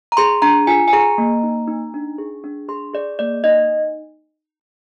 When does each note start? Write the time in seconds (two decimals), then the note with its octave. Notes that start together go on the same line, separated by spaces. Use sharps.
0.12 A#5
0.17 G#4 C6
0.42 D4 A#5
0.67 F4 G#5
0.88 G#5
0.93 G#4 A#5
1.18 A#3
1.43 D#4
1.68 D#4
1.94 D4
2.18 G#4
2.44 D4
2.69 G#4 C6
2.94 G#4 D5
3.19 A#3 D5
3.44 D#4 D#5